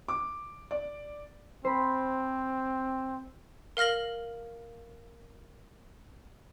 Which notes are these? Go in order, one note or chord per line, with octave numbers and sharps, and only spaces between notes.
D6
D5
C4 C5 B5
A#4 F5 F6 A#6 F#7